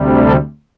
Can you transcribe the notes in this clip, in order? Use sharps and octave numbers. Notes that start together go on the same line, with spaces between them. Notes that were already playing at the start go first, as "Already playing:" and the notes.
Already playing: D2 C3 G3
A4